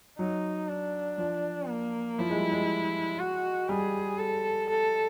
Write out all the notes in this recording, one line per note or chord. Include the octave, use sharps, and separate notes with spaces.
F#3 D#4
D4
F3
A#3
F3 E4
G#3
G3
G#3
F#4
G3 G#4
A4
A4